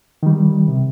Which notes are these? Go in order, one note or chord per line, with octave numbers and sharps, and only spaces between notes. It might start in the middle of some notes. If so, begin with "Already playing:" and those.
D#3 G3
C3